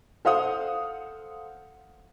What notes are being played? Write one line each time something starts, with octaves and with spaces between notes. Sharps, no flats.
A4 C5 F5 F#5 D#6